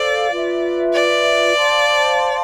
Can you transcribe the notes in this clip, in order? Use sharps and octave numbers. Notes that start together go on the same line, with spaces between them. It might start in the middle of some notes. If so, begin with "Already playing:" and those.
Already playing: A4 C5 D5 F5
F4 B4 E5
D5
C5 F5 A5 C6